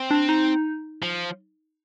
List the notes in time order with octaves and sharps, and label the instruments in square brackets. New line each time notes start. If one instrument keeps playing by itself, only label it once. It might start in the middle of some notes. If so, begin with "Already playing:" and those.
Already playing: [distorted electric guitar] C4
[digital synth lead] D4
D#4
[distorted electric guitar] F3